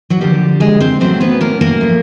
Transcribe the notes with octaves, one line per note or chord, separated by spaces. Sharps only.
F#3 F#4
D3 F3 G3 A#3 G4
G#3 G#4
C4 C5
A2 F#3 A3 C4 C#4 C5
B3 B4
A#3 A#4
A#3 A#4
A2 F3 A3